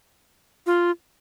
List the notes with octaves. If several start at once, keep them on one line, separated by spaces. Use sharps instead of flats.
F4